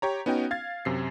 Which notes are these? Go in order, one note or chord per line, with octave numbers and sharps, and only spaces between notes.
G4 C#5 A#5
B3 C#4 D#4 F#4 G5
F5 G#6 A6
F#2 C3 C7